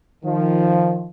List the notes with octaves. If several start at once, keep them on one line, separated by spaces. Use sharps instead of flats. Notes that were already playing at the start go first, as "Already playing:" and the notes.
D#3 F3